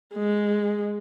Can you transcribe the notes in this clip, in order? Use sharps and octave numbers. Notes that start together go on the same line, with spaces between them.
G#3